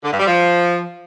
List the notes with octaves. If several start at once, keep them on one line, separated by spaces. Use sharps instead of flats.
D3
G2
G3
F3